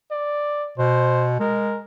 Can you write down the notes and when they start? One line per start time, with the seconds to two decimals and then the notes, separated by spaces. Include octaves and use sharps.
0.11 D5
0.78 B2 C5
1.40 G#3 A#4